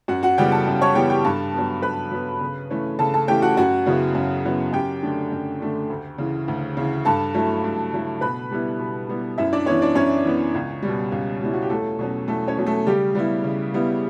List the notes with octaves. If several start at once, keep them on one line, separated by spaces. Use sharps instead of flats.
F#2 F#4 F#5
F#4 F#5
C#3 E3 G3 B3 G4 G5
A4 A5
F#2
C#5 C#6
C#3 E3 G3 B3 G4 G5
G4 G5
G2 A4 A5
F#3 B3
G2 B4 B5
F#3 B3
C#3
E3 A3 C#4
C#3 A4 A5
A4 A5
E3 A3 C#4 G4 G5
F#4 F#5
F#2 F#4 F#5
C#3 F#3 B3 E4
F#2
C#3 F#3 B3 E4
F#2 G4 G5
D3 A3 D4
F#2
D3 A3 D4
D2
C#3 E3
D2
C#3 E3
G2 A4 A5
F#3 A3 E4
G2
F#3 A3 E4
B2 B4 B5
G3 B3 E4
B2
G3 B3 E4
F#2 E4 E5
D4 D5
E3 B3 C#4 C#5
D4 D5
F#2 C#4 C#5
E3 B3
C#2
G3
B2
C#2
B2 G3 E4
F#4
G4
E2 A3 A4
B2 F#3 C#4
E2 A3 A4
C#4 C#5
B2 F#3 C#4
A3 A4
C#3 G3 G4
G3 B3 E4
C#3
G3 B3 E4